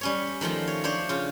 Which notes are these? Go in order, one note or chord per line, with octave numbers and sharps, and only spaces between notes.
G3 C#4 C#5
D#3 F3 A3 F4
C#5
D4 C5 C#5
C#3 F4